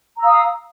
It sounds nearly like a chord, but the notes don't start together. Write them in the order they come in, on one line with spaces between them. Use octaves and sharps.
A#5 E6 F5 D#6